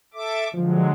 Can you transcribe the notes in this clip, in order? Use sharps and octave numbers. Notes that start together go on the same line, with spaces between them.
A4 E5 D6
D3 F3 F#3 G#3